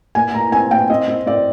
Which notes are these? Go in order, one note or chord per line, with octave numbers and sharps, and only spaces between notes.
A#2 G#5
A#2 A#5
C4 G#5
A#2 G5
C4 D#5
C4
C4 D5